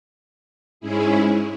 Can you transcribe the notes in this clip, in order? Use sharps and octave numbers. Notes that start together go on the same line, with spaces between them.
G#2 G#3 C#4 E4 G#4